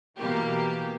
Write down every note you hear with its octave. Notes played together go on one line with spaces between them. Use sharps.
B2 E3 A#3 B3 G4